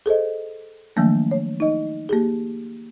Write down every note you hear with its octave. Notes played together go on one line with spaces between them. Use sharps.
G#4 A4 C5 D#5
D#3 F3 F#3 A3 A#3 D4
C#5
D#4 D#5
A#3 G4 G#4